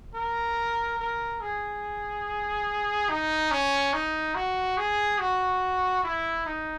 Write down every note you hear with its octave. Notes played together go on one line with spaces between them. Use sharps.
A#4
A#4
G#4
D#4
C#4
D#4
F#4
G#4
F#4
E4
D#4